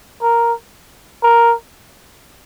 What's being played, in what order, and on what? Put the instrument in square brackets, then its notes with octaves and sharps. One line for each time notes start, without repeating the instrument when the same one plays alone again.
[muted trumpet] A#4
A#4